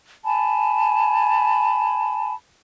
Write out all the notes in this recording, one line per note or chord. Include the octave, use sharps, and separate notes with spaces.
G#5 A5 B5